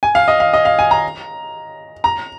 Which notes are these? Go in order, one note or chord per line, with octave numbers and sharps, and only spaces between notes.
G#5
F5
D#5
F5
D#5
F5
G#5
A#5
A#5